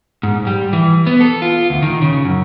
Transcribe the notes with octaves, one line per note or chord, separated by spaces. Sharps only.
G#2
G3
E3
B3
A4
F4
D2
D#3
C#3
F#2